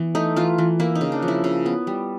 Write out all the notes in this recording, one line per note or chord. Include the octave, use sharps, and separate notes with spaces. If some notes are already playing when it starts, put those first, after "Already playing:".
Already playing: E3 B3
A3 D#4
E3 F4
E3
A#3 E4
D#4
C#3
D4
F3
E4
C#3
B3
G3